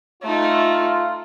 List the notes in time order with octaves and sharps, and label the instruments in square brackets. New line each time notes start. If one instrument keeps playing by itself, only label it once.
[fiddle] A3 D#4 [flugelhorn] F4